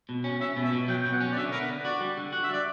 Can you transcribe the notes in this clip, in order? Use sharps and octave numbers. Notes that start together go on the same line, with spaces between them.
B2
C#4
C#4 E5
B2
E5
B2
F#3 G5
B2 G5
F#5
C#4
D5
D3 E5
B3 A#4
B4
D3
F#4 D5
G3
D3
F#4 F#5
E5
G3 D5